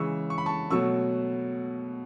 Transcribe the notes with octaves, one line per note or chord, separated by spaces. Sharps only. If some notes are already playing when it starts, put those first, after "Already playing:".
Already playing: C#3 E3 G#3 C#6 E6
C#6
B5
A5 C#6
B2 F#3 A3 C#6 E6